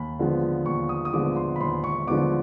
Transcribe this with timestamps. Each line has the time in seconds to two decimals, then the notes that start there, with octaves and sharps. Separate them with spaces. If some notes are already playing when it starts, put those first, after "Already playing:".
Already playing: D#2 B5
0.19 D3 F3 G#3 B3
0.66 D#2 C#6
0.89 D#6
1.05 D#6
1.13 D3 F3 G#3 B3 D6
1.36 C6
1.56 B5
1.61 D#2 C6
1.84 C#6
2.07 D3 F3 G#3 B3 D6